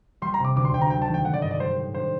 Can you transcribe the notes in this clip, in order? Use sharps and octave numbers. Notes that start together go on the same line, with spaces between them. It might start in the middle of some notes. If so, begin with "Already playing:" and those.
G3 C6
A#5
C3 D6
D2 D6
C6
D2 G5
A#5
F#3 G5
A5
D#3
G5
A3 F#5
D5
G2 D#5
D5
G3 C5
A2
D4 C5